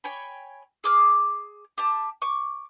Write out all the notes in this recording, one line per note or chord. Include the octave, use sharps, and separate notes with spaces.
C#5 G5 G#5 B5
G#4 D6 F6
G4 A5
C#6 D6